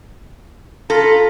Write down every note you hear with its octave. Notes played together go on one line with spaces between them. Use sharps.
F4 A4 A#5 B5